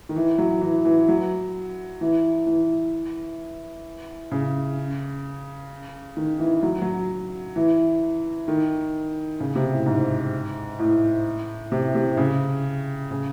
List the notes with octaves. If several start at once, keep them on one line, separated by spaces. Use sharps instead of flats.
D#3
E3
F#3
E3
E3
F#3
E3
E3
C#3
D#3
E3
F#3
F#3
E3
D#3
C#3
C3
A2
G#2
A2
C3
C3
C#3
C#3